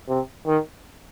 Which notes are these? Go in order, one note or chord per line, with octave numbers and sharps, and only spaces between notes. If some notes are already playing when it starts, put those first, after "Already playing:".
C3
D#3